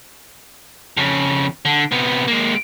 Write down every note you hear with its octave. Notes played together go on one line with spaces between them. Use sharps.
F2 C#3
D3
C3 B3
G#3 A#3